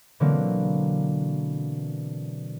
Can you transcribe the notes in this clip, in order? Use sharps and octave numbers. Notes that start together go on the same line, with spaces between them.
B2 D3 E3 F#3 A#3 C4